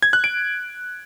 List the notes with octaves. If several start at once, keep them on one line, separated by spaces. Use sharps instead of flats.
G#6
F#6
D7